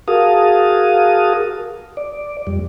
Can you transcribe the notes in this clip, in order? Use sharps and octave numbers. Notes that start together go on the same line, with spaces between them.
F#4 G#4 A#4 F5 A5 D#6
D5
F2 G3